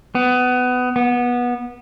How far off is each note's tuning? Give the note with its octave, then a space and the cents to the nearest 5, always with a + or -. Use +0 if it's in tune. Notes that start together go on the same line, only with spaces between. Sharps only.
B3 +20
B3 -20